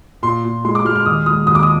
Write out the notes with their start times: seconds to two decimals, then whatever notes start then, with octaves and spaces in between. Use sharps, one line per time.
0.23 A#2 C6
0.44 A#2
0.65 G#3 C6
0.75 D6
0.85 G#3 F6
0.96 F6
1.06 D#2 D#6
1.26 G#3 D#6
1.47 D#2 D#6
1.55 D6
1.63 D#6